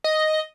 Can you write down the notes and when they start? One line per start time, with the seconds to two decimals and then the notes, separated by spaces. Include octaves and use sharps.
0.04 D#5